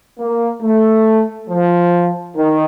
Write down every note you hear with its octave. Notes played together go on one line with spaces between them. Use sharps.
A#3
A3
F3
D#3